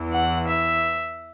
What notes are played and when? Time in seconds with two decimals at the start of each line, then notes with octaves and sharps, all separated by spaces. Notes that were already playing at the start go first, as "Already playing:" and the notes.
Already playing: E2 E3
0.13 F#5
0.48 E5